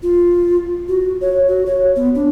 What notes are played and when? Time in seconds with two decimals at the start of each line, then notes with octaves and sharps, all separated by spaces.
0.03 F4
0.88 F#4
1.21 C#5
1.48 F#4
1.66 C#5
1.96 B3
2.15 D4